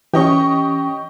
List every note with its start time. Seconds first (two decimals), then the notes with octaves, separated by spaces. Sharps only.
0.14 E3 C#4 G4 D#5 C#6